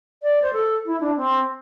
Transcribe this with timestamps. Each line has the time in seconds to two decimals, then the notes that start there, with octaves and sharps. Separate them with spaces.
0.23 D5
0.42 C5
0.53 A4
0.85 E4
1.00 D4
1.17 C4